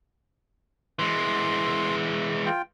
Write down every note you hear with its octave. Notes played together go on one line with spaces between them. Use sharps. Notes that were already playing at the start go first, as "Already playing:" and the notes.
E3 G#3 C6
F4 G5